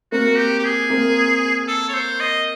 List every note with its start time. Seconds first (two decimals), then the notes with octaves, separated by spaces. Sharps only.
0.12 A#3 C4 F#4
0.38 G4
0.59 G4
0.64 G#4
0.90 A#3 C4
1.68 A4
1.89 C#5
1.94 C5
2.20 D#5